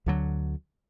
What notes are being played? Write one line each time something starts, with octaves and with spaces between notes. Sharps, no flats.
D2 D3 F#3